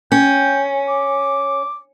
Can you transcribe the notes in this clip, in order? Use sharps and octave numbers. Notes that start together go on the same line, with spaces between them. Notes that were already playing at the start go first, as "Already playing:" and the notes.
C#4 G5
D6